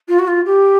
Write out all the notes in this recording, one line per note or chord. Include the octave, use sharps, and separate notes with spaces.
F4
F#4
F4
G4